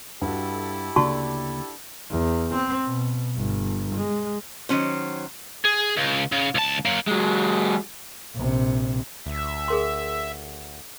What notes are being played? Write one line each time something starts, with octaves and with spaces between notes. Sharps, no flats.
G2 E4 F#4 G4 A4
D2 C#3 A#3 D4 F#4 D5 A5 C#6
E2
C4
B2
G1
G#3
D#3 F#3 C#4 C5
G#4
C#2
C#3
C#2 A5
F#3 A#3
F#3 G#3
A#1 C3
D2 E5
G#4 A#4 C6